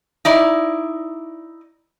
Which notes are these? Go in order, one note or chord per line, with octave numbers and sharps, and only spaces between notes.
D#4 E4 D5